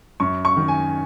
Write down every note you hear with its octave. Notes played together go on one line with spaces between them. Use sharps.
F#2 C#6
C#6
D#3
G#5